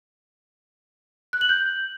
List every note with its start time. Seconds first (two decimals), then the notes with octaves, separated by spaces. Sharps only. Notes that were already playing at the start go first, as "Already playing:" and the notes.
1.33 F#6
1.41 F#7
1.49 G6